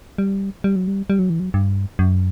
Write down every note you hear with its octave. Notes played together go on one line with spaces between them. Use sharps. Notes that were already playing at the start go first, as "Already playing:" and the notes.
G3
G3
F#3
G3
G3
F#3
E3
F#3
G2
F#2